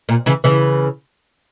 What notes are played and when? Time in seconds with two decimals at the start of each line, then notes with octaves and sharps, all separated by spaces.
0.09 A#2
0.26 C#3 E3
0.44 C#3 E3